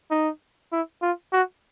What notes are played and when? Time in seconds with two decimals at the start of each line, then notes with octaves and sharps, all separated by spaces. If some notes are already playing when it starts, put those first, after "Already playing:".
0.11 D#4
0.72 E4
1.02 F4
1.32 F#4